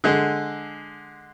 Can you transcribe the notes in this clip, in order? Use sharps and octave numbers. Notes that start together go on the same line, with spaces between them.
D3 G#3